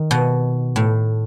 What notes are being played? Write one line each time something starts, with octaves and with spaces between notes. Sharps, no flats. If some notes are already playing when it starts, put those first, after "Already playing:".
Already playing: D#3
B2
A2